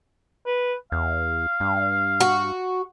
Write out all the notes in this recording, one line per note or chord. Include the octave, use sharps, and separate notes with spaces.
B4
E2 F5
G2
F#4